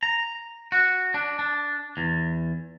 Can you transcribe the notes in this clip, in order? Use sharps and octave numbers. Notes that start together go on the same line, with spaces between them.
A#5
F#4
D4
D4
E2